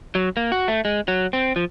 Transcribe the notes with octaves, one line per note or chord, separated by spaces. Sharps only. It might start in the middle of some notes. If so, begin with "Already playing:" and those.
F#3
A#3
F#4
A3
G#3
F#3
C4
F3